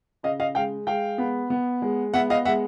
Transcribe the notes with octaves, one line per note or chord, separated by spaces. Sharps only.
C#3 D#5 F5
D#5 F5
G#3 F5 G5
G#3 F5 G5
B3
B3
G#3
B3 E5 F#5
D#5 F5
G#3 E5 F#5